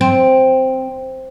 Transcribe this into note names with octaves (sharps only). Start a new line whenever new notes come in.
C4